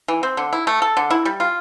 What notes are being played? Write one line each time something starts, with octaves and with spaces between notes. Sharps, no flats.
E3
C4
D3
E4
A3
A4
D3
E4
G3
F4